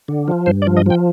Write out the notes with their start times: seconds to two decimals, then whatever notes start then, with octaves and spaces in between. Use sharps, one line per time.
0.08 D3
0.28 F3
0.46 G2 C5
0.62 D5
0.67 F3
0.77 D#5
0.86 F3 G5